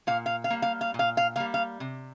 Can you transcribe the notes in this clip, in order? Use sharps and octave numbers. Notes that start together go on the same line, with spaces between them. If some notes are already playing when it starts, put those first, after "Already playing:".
A#2 F5
F5
F5
G3 A#3
F5
F5
A#2
F5
F5
G3 A#3 F5
F5
C3